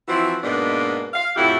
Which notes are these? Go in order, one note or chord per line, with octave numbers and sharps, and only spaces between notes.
E3 F3 C4 E4 F#4
G#2 B2 A#3 B3 D4
F5
F2 A2 E4 F#4 G4